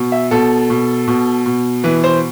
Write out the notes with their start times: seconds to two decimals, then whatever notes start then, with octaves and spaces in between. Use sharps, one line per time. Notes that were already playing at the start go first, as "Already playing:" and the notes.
Already playing: B2
0.12 E5
0.31 B2 A4
0.70 B2
1.08 B2
1.46 B2
1.84 E3 B4
2.04 C5